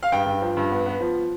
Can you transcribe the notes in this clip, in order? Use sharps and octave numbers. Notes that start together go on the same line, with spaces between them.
F5
G2 G5
G2
F3
G2
B3
B3
F3